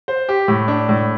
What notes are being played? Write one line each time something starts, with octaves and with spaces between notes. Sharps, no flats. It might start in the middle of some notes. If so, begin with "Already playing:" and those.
C5
G4
A2
D4
A2